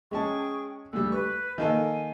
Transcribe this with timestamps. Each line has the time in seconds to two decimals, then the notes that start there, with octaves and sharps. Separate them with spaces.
0.11 G#3 C#4 G#4 G5 A5 C#6
0.93 D2 G3 E6
1.12 B4 C#6
1.58 D#3 A#3 A4 G#5